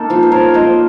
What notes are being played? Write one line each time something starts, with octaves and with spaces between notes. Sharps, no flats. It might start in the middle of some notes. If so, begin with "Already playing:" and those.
Already playing: A#3 D#4 A4
F3 F4
C5
A#4 C#5
A#3 D#4 C5 D#5